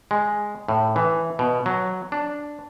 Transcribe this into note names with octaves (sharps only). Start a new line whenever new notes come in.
G#3
A2
E3
B2
F#3
D4